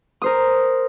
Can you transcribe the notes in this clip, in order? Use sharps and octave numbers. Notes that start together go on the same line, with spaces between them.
A#4 C5 D#6